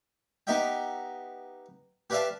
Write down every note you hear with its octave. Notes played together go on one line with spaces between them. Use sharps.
B3 D#4 G4 D#5 E5 G5
G4 B4 D5 E5 F5 A5